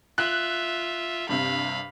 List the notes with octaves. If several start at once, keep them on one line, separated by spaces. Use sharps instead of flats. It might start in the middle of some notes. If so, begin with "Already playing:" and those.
F4 E5 F#6
G2 C3 F5 B5